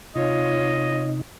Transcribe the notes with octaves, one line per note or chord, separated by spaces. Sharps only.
C3 D#4 F4 C#5 D#5